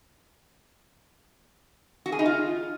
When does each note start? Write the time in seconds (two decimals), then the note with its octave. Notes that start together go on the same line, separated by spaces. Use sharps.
2.06 F#4
2.12 G#4
2.19 D#4
2.26 F4